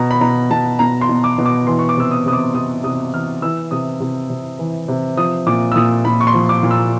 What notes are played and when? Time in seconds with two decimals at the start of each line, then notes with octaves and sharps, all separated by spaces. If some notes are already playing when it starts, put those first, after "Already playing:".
Already playing: B2 A#5
0.11 B5
0.21 B2 A#5
0.51 B2 A5
0.79 B2 A#5
1.01 C6
1.09 B2
1.24 D6
1.38 B2
1.46 D6
1.67 E3 C6
1.79 C#6
1.89 D6
1.97 C3 E6
2.11 D#6
2.26 C3 D#6
2.33 D6
2.55 C3 D#6
2.84 C3 D#6
3.13 E3 F6
3.42 E3 E6
3.71 C3 D#6
4.01 C3
4.30 C3
4.59 E3
4.88 C3
5.17 F3 D#6
5.47 A#2 D6
5.72 E6
5.76 A#2 D#6
6.05 A#2 B5
6.21 C#6
6.27 C6
6.34 F3
6.49 D6
6.63 A#2
6.71 E6